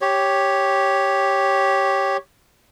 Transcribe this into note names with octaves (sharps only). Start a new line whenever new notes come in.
G4 C#5